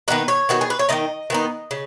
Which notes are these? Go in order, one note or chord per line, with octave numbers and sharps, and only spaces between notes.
D#3 B3 D#4 B4
C#5
D#3 B3 D#4 F#4
G#4
B4
C#5
D#3 B3 D#4 D#5
D#3 B3 D#4
C#3